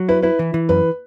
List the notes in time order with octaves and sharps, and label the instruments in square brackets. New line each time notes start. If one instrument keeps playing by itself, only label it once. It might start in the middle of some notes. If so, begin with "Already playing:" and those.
Already playing: [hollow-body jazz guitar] F#3
[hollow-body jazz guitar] E4 [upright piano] B4
[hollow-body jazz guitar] E4 [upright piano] B4
[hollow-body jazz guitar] E3
E3
[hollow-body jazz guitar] F#2 [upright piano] B4